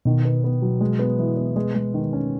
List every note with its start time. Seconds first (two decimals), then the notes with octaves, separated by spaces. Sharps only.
0.05 B2 D#3
0.25 B3
0.44 B3
0.62 F#3
0.81 G#3
0.99 B3
1.19 E3
1.37 B3
1.56 G#3
1.75 G#3
1.94 D#3
2.13 C#4